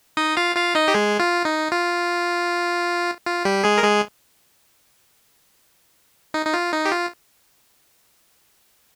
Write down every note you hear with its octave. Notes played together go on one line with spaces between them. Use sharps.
D#4 D#5
F4 F5
F4 F5
D#4 D#5
G4
G#3 G#4
F4
D#4
F4
F4
G3 G4
G#3 G#4
A#4
G#3 G#4
D#4
D#4
F4
D#4
G4
F4